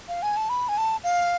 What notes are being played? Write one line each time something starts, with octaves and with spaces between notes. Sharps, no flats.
F5
G#5
A5
B5
G#5
A5
F5